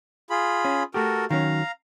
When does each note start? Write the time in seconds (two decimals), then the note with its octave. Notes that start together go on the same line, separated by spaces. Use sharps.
0.30 F4 G#4 B5
0.65 C#4
0.94 A3 F#4 G4 A4 A#4
1.30 D#3 F#3 C#4 F5 A#5